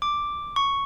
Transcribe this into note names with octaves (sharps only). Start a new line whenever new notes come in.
D6
C#6